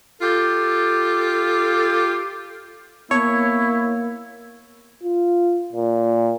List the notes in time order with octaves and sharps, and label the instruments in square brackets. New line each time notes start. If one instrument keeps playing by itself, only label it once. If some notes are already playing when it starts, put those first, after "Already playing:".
[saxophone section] F4 G4 A4
[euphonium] A#3 [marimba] B3 [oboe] E4 [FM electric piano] C#5
[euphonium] F4
A#2